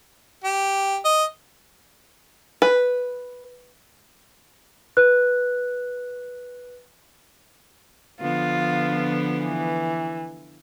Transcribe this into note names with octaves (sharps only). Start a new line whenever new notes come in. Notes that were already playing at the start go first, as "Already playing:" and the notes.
G4
D#5
B4
B4 F#6
D3 F3 B3 F4
E3